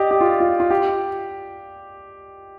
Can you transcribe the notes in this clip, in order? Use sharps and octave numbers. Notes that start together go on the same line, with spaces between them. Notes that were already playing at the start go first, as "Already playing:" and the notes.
Already playing: G4 D5 D#5
G4
F4
F4
F4
G4